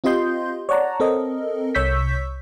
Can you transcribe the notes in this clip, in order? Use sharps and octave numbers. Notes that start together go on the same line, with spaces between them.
C4 F4 G4 D#5 C6 G6
C#5 D5 F#5 A5 A#5
C4 A4 A#4 D#5
C2 C#5 C#6 E6 G6 B6